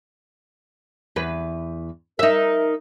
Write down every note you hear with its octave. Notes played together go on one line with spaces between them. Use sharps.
E2 B4
D#4 A#4 E5